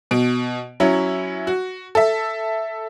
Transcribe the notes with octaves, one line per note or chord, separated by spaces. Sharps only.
B2 D7
F#3 C#4 E4
F#4
A4 E5